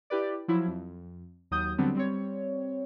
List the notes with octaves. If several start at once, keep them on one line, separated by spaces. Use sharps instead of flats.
E4 G4 B4 D5
F3 F#3 E4
F2
D#2 F#3 D#6 G6
D3 F#3 G3 B3 C4 D4
G3 C4 C#5